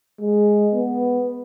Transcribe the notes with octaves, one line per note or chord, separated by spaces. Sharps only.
G#3
B3